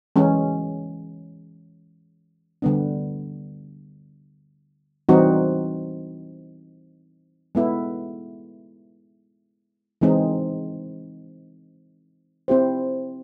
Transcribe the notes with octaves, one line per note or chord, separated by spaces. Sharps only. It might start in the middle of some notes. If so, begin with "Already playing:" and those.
E3 G#3 C#4
D3 G3 B3 D4
E3 G3 C4 D#4 F#4
G#3 B3 E4 A4
E3 G#3 C4 D#4
C4 E4 G4 C5